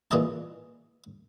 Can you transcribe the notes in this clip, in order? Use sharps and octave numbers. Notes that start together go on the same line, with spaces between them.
A#2 E3 G#4 D5 D#5 A5